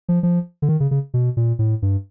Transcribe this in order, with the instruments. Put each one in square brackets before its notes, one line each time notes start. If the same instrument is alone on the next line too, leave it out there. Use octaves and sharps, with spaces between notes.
[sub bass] F3
F3
D3
D#3
C#3
C#3
B2
A#2
A2
G2